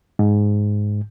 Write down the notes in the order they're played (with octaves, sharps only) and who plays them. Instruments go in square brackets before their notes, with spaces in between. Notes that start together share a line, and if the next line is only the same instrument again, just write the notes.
[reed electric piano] G#2